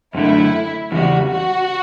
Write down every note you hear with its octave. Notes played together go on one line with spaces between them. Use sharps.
F#2 D3 A3 E4
E2 C#3 G3 F#4
F#4